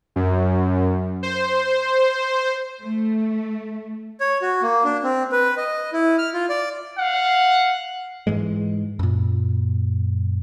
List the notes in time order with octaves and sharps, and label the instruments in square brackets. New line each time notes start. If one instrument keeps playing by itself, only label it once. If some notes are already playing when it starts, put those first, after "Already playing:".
[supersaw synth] F#2
C5
[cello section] A3
[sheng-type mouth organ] C#5
F#4
A#3
D4
C4
B4
D#5
E4
F6
F4
D5
[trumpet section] F5 F#5
[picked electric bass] G#2 E3 G#3
F#2 A#2